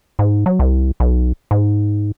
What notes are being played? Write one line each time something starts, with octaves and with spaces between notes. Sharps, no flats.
G#2
F#3
C2
B1
G#2